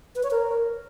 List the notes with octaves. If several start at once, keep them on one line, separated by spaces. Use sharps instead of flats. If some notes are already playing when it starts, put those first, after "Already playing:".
B4
C#5
A#4